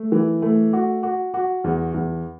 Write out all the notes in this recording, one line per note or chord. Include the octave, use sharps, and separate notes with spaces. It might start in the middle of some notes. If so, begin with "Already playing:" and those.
Already playing: A3
E3
A3
F#4
F#4
F#4
E2
E2